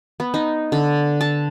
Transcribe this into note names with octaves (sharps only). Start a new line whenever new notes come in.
B3
D#4
D3
A5